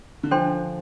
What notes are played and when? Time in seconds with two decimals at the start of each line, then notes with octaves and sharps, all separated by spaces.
0.23 D3
0.31 F3 D4 A4 C5 G5 C6